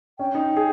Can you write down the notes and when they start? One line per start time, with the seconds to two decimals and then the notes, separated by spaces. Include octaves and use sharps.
0.19 C#4 G5
0.35 D#4
0.57 G#4